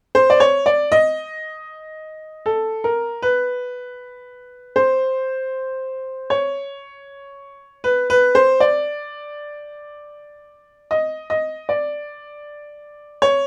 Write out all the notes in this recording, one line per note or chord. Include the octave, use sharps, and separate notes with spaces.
C5
D5
C#5
D5
D#5
A4
A#4
B4
C5
C#5
B4
B4
C5
D5
D#5
D#5
D5
C#5